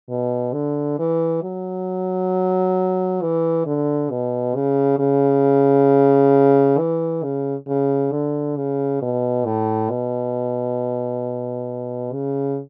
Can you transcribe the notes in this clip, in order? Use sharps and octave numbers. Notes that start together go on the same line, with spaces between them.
B2
D3
E3
F#3
E3
D3
B2
C#3
C#3
E3
C#3
C#3
D3
C#3
B2
A2
B2
C#3